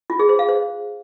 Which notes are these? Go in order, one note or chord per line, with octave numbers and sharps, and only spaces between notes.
F4
G#4
C5
F5
C5